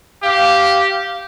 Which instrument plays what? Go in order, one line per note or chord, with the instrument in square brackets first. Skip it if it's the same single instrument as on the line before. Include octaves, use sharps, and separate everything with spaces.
[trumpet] G4 [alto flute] F5